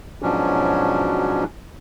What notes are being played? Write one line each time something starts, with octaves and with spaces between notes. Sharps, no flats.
G#2 B2 F3 F#3 C#4 D4